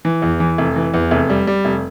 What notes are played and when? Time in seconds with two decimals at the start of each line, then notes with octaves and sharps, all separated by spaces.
0.05 E3
0.22 E2
0.40 E3
0.58 F1
0.76 E3
0.94 E2
1.11 F1
1.30 G3
1.47 G3
1.65 F1